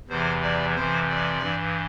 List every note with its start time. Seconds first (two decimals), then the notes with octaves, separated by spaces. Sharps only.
0.08 E2 C3 E3 C5
0.42 D5
0.75 F2 C3 E3 C5
1.09 D5
1.42 G2 E3